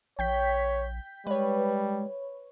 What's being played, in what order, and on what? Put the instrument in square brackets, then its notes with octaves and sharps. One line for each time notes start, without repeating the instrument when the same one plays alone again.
[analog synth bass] A#1 [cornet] C#5 [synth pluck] G5 G6 B6
[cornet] G3 [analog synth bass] G#3 [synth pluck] B4 C#5